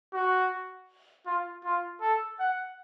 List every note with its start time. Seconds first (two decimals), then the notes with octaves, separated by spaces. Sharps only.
0.13 F#4
1.26 F4
1.64 F4
2.01 A4
2.40 F#5